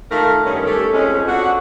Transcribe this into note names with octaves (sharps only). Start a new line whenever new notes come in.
D#3 A3 D#4 F4 A4 A#4
G2 D#3 C#4
A3 C#4 G4 A4
F2 G#3 C#4
D3 B3 D4 F#4